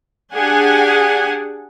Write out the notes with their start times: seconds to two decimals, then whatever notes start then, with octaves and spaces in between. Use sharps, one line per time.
0.33 D4 G4 G#4 F#5 G#5